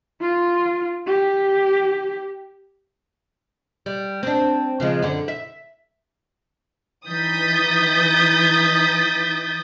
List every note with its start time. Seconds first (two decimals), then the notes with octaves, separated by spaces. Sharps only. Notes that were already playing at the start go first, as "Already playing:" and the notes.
0.22 F4
1.06 G4
3.86 G3
4.23 C4 D4
4.80 C#3 F3 G#3
5.02 F#2 D3
5.28 E5
7.08 E3 D#4 D#6 G6 A6 B6